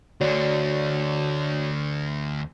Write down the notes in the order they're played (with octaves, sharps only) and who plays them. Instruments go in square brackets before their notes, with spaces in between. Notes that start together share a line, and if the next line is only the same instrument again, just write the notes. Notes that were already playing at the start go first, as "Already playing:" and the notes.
[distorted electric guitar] D2 D3 [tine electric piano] F#4 C#5 D5